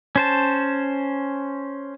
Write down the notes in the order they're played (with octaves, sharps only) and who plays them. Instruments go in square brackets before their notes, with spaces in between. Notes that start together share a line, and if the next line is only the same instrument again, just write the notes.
[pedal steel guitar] C#4 C5 A5